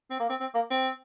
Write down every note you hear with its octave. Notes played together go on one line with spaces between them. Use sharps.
C4
A#3
C4
C4
A#3
C4